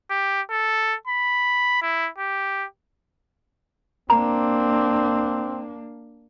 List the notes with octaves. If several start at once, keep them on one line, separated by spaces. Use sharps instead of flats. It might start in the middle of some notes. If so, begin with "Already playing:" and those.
G4
A4
B5
E4
G4
A#3 C4 D4 A#5